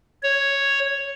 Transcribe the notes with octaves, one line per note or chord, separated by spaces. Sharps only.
C#5